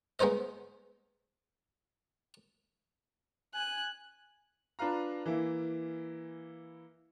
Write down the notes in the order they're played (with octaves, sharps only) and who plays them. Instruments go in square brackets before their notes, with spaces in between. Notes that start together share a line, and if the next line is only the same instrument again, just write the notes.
[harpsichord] G#3 B3 D#4 C5 D#5
[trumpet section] G#5 [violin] F#6
[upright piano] D4 F4 B4 F5 A#5
E3 A#3 E4